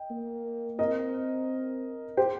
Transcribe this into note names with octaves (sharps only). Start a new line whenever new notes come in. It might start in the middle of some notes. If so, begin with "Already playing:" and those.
Already playing: D#5 G5
A#3
C4 A#4 D#5
G4 C5